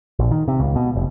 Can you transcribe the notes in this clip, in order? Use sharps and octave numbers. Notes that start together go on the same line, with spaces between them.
A#1
D#3
C3
C#2
B2
F1